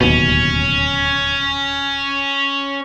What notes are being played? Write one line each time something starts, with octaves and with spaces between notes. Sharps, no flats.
D1 D#2 B2 C#4